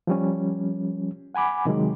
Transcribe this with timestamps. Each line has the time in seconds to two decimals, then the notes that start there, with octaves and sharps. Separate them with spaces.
0.07 F3 G3 C#4
1.35 F#5 G#5 B5 D6
1.65 C3 D#3 F#3 G#3